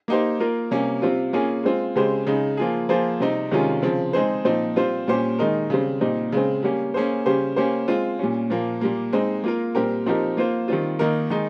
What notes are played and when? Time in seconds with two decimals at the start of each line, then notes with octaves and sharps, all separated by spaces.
0.08 A#3 D#4 G4 C5
0.40 A#3 F4 A#4
0.71 C3 G3 A#3 C#4
1.02 C3 G3 C4 F4
1.33 A#3 C#4 F4 G#4
1.64 G#3 C4 F4
1.96 C#3 G#3 C4 G4 C5
2.27 C#3 G#3 D#4 G#4
2.57 F3 A#3 F4 G#4
2.89 F3 A#3 F4 G#4 C5
3.20 C3 G3 C4 D#4
3.51 C3 D#3 G#3 C#4 F4
3.82 C#3 F3 C4
4.13 G#3 C4 D#4 G#4 C5
4.45 A#2 F3 C4 D#4
4.76 G3 C4 F4 C5
5.07 A#2 G3 C#4 G4 C5
5.39 D#3 G#3 D#4 A#4
5.70 C#3 G3 C4
6.01 A#2 G3 C4 D#4
6.32 C#3 G#3 C4
6.63 G3 A#3 C#4 G4
6.94 A#3 C#4 G#4 C5
7.26 C#3 G3 C#4 G4 C5
7.56 A#3 C#4 G4 C5
7.88 G#3 C4 F4
8.19 A#2 G3 C#4
8.50 A#2 F3 A#3
8.81 A#2 G3 A#3
9.13 G#3 C4 D#4
9.44 A#3 F4 A#4
9.75 A#2 G3 C4 G4 A#4
10.06 F3 C4 D#4 G4 A#4
10.37 A#3 F4 C5
10.68 D#3 G3 C4 F4
10.99 D#3 A#3 D#4 A#4
11.30 D#3 G#3 D#4